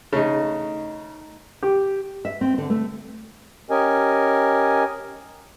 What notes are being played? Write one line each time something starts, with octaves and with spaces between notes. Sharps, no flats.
C#3 A3 D#4
G4
E5
C4
D3
A3
C#4 G4 A#4 D#5 G#5